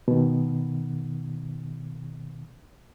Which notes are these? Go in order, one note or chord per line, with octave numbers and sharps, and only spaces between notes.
B2 D#3